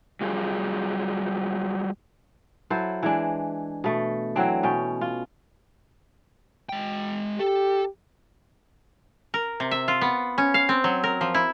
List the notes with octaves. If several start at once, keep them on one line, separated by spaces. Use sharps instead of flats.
F#3 G3 F4 G#4
F#3 E4 A4 C5
E3 G#3 D4
B2 A3
E3 F#3 C4 D4
B2 C#4 G5
F4
G#3 G5
G4 A4
A#4
C3
E5
F4
B3
C#4
F5
C4
F#3
A#4
F3
E4